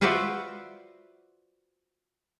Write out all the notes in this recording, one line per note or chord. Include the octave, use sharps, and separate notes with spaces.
F4 F#4 B4 C5 D5 E5